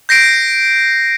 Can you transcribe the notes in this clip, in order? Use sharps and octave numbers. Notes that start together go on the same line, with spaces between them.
G6 A#6 C7 D7